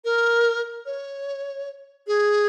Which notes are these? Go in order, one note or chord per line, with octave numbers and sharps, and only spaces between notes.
A#4
C#5
G#4